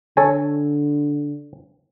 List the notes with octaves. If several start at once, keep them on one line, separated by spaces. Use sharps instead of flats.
D3 A4 C#5 G#5